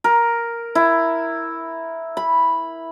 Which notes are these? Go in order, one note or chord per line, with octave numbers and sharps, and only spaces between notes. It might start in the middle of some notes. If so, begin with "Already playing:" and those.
A#4
E4
B5